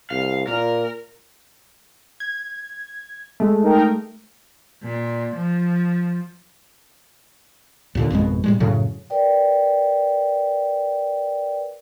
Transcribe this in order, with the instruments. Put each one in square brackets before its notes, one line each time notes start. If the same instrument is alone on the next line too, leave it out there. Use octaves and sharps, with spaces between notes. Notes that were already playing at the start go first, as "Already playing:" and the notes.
[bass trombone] C2 [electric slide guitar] F5
[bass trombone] A#2 [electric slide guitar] A#4
[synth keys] G#6
G#3 A3
[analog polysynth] D#4 A#4 G5
[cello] A#2
F3
[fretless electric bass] D#2 A#2 D3
G#1 F2 B2 G#3
A2 G3 G#3
F#2 A2 C#3 F#3
[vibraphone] A#4 B4 D5 G5